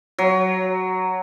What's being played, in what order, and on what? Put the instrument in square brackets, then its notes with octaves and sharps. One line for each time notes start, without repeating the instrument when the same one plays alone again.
[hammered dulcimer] F#3